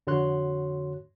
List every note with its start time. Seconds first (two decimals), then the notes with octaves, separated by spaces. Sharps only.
0.07 F2 D3 F#4 C#5 C6 F#6